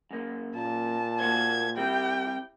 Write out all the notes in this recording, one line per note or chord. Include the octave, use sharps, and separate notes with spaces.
F#2 A#3
A#2 A5
A#3 F#4 C5 G#6
G3 C4 E4 G4 G5